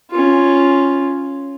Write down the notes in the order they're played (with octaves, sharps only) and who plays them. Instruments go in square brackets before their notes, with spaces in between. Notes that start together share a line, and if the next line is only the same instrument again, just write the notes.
[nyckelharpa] C#4 F4